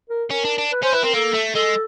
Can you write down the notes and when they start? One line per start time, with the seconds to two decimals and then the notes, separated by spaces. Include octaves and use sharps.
0.10 A#4
0.31 C#4 A#4
0.45 D4
0.58 D4
0.72 B4
0.83 C#4 C5
0.93 E4 B4
1.03 C4 A#4
1.14 A#3 A4
1.34 A3
1.55 G#3 A4